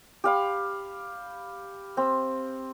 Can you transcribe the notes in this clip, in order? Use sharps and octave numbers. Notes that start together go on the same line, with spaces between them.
G4 F5 B5
C4